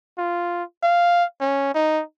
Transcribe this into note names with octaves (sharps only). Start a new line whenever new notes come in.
F4
F5
C#4
D#4